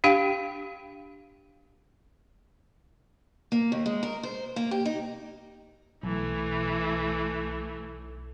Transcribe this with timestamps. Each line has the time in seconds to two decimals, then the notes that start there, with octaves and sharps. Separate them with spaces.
0.04 D4 G4 F5 G5
3.52 A#3
3.72 D#2
3.86 G#3
4.03 A#4
4.23 C5
4.56 A#3
4.71 G4
4.85 D#4
6.03 B1 E3 A3